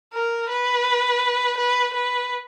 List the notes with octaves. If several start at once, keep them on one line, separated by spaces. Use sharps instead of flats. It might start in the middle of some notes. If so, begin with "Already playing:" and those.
A#4
B4
B4
B4